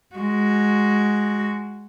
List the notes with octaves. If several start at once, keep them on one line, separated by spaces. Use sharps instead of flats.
G#3 F#4